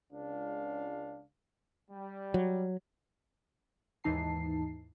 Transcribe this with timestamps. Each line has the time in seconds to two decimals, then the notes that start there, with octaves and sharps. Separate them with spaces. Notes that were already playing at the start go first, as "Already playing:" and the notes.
0.12 C#2 D4 F5
1.90 G3
2.34 F#3
4.04 D#2 G#2 E3 D#4 A5 C7